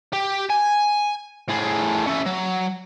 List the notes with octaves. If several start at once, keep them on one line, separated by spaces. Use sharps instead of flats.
G4
G#5
A2 G#4
C#4 E4
F#3